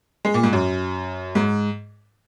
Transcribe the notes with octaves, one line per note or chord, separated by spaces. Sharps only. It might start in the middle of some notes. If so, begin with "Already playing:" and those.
G#3
A#2
G#2
F#2
G#2